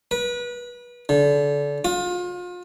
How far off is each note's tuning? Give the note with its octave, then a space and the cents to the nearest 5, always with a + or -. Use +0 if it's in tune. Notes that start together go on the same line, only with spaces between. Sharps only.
B4 -30
D3 -30
F4 +35